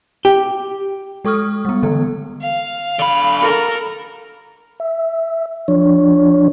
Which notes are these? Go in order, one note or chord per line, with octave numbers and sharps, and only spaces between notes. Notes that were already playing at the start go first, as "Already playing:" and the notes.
G4
G#3 A4 C#6 D#6 F6
G3 B3
D3 E3 B3 A4
F5
D3 B5
A4 A#4
E5
F3 D4 C#5